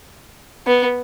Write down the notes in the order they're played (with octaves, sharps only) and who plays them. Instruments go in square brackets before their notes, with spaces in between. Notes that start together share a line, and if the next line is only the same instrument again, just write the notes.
[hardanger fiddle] B3